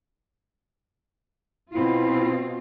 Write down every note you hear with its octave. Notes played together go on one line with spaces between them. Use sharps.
B2 C4 E4 F4